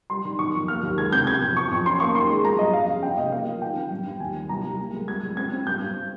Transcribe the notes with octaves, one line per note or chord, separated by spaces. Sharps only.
G3 C6
D#3
D#3 C#6
F2
A#3 F6
D#2
C#2 G#6
C3 G6
C3 G#6
F2
F3 C#6
F2
C#4 C6
A#3 C#6
D#3 C6
G#3
F3 A#5
G2 D#5
F2 F5
C#3
C#3 G5
F1 D#5
A#3 F5
F3
D#3 G5
C4
G2
G2
D#2 G#5
G3
C2 A#5
C2
A#3
C#2
G3 G#6
C#2
C4 G#6
C4
G2 G6
G2